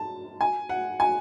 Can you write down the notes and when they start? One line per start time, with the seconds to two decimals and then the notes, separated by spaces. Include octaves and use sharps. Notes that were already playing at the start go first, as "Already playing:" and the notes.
Already playing: A5
0.41 G#5
0.69 F#5
1.00 G#5